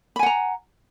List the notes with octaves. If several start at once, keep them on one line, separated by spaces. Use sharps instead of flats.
F#5 G#5 A#5 B5